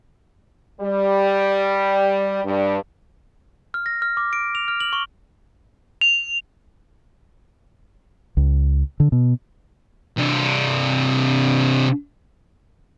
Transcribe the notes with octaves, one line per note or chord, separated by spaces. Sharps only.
G3
G2
F6
A#6
F6
D6
D7
F7
F6
F#7
C#6
F7
C#2
D3
B2
C3 D4